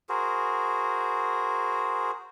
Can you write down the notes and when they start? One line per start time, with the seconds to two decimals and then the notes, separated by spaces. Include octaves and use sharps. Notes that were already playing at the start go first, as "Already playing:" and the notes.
0.09 F#4 G#4 A#4 C5